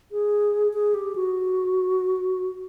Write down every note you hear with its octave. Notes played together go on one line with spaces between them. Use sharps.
G#4
G#4
G4
F#4